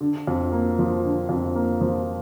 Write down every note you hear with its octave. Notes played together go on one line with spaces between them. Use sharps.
D3
F2
A#3
F3
D3
F2
A#3
F3